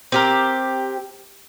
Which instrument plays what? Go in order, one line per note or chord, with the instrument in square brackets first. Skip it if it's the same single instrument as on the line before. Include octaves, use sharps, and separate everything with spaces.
[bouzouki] C4 G4 A#4